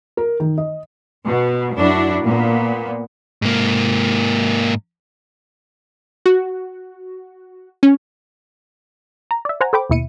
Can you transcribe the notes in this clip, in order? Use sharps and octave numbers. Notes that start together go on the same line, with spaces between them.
A#4
D#3
D#5
B2
F#2 D4 E4 F#4
A#2 A#3 B3
G#2 A#3
F#4
C#4
A#5
D5 E5
C5 F#5 G#5 A#5
A4 C5 G5 B5 D6
D#2 B2 E4 C#7 D#7